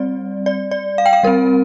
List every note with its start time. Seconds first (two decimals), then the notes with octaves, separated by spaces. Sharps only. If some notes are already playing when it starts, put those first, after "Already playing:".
Already playing: G3 C4 D5
0.46 D5
0.71 D5
0.98 F5
1.06 G5
1.13 F5
1.23 G3 C4 A#4